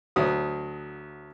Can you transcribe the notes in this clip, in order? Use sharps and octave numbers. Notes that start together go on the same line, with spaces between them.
D2 F#3 D#6